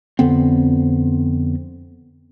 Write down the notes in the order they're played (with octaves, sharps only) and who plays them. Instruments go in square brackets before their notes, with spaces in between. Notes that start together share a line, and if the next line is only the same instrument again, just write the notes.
[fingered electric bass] F2 D3 B3 C4